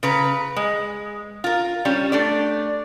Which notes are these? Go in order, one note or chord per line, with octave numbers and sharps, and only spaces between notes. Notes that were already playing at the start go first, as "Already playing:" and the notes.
C#3 B4 A#5
G#3
F4 A#4
G3 C#4
A3 D4 D5